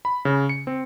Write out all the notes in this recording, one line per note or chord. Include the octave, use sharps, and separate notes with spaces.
B5
C#3
C#7
C4